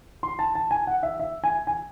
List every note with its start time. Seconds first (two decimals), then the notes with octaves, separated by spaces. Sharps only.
0.23 C6
0.39 A5
0.55 A5
0.71 G#5
0.87 F#5
1.03 E5
1.20 E5
1.44 G#5
1.67 G#5